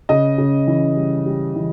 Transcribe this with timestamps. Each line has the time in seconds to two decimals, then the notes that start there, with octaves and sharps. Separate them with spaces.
0.09 C#3 D#5
0.38 C#3
0.67 E3
0.97 G3
1.26 G3
1.56 E3